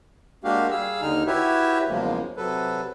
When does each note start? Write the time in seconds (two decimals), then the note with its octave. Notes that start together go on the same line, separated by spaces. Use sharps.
0.44 G#3 A#3 D4 F#4 G4 F5
0.71 G3 G#4 F5 E6
1.01 D#2 D3 D#4 F6
1.27 E4 F#4 G4 B4 C#5 E5
1.89 E2 C#3 F3 F#3 G#3 A#3
2.37 C3 F#3 A4 B4